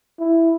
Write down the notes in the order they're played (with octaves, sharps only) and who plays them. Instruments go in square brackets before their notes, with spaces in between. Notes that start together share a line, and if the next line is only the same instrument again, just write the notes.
[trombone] E4